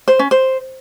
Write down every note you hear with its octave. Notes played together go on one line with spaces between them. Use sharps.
C5
C#4
C5